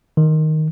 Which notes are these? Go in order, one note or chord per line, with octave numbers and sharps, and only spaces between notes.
D#3